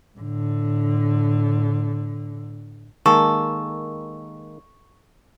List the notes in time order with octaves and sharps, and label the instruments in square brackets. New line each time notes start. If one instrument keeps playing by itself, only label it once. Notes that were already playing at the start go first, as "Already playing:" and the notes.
[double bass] A2 D3
[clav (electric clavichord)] D#3 G#3 A#3 [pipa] A4 [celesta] C#6